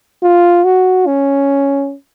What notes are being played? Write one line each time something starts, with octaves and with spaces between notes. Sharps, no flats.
F4
F#4
C#4